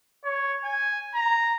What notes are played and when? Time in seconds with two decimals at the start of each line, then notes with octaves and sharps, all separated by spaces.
0.24 C#5
0.64 G#5
1.15 A#5